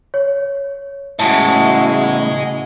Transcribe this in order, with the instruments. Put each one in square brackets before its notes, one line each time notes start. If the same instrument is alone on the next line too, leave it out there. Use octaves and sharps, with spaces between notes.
[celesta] C#5
[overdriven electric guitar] A2 C#3 [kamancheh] E4 F#4 [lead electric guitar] D#5 G#5 [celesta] A5